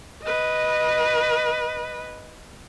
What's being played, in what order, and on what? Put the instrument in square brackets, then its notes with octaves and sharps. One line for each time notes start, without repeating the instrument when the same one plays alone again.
[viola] B4 D#5